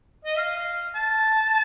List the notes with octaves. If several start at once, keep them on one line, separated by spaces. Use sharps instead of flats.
D#5
F5
F5
A5